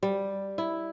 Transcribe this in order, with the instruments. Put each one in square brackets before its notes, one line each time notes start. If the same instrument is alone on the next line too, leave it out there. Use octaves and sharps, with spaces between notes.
[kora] G3
E4